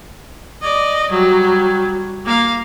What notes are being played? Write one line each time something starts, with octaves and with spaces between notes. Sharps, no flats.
D5 D#5
F#3 G3
A#3 F5